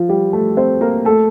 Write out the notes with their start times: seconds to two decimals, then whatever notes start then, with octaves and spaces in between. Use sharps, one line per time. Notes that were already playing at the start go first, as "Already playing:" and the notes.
Already playing: F3 F4
0.09 G3 G4
0.33 A3 A4
0.57 C4 C5
0.81 A#3 A#4
1.05 A3 A4